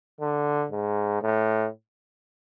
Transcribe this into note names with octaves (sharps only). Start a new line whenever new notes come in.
D3
G#2
A2